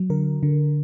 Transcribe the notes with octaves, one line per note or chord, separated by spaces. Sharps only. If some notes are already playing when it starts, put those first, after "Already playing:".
Already playing: F#3
D3 A#4
D3